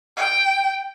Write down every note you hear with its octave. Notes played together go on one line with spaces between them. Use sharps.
G5